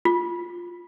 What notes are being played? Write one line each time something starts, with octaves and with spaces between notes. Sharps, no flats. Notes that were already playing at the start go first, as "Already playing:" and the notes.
F4